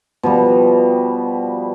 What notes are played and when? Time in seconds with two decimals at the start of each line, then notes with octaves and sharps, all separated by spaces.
0.23 B2 F3 G3